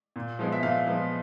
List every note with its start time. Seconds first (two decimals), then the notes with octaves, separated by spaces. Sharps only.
0.16 A#2
0.39 F3 G#3 B3
0.52 E5
0.63 A#2 F5
0.87 F3 G#3 B3